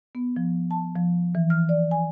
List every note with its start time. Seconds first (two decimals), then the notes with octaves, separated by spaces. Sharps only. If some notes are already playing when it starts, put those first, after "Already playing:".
0.15 B3
0.36 F3
0.71 A5
0.96 F3
1.35 E3
1.50 F6
1.69 D5
1.91 G#5